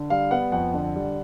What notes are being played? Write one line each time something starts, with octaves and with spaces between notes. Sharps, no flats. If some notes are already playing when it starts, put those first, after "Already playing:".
Already playing: D3
G3 F5
B3 F#5
F2 F#5
D3
G3